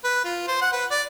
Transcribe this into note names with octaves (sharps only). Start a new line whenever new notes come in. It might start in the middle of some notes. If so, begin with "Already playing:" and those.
B4
F4
C5
F#5
B4
D5